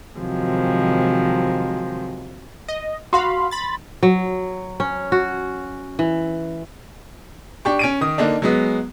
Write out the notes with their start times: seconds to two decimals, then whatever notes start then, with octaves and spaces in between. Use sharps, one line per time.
0.19 C3 D#3 F3 F#3 G#3
2.68 D#5
3.13 F#4 F5 B5 C6
3.51 B5 A6
4.03 F#3
4.80 C#4
5.12 F#4
5.99 E3
7.65 D4 G4 C#6
7.79 C#4 D7 D#7
8.01 D#3 D#6
8.18 D3 A#3 D4 D#4
8.42 F#3 G#3 B3